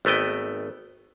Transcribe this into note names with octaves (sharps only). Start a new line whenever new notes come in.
G#1 A3 B3 D#5 G5